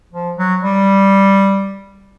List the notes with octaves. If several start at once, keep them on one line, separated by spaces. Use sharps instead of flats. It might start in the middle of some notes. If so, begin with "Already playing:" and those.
F3
F#3
G3